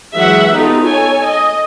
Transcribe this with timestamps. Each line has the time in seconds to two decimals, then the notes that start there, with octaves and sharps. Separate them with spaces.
0.15 E3 F#3 G#3 E5 F#5
0.53 B3 D#4 F4 G4 A4
0.85 A4 C#5 G#5
1.28 D#5